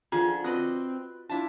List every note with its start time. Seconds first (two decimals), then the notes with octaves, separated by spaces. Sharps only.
0.12 D3 F3 C#4 F4 G#4
0.44 C4 F#4 B4 D5 D#5 D#6
1.29 D4 E4 F4 C5 A5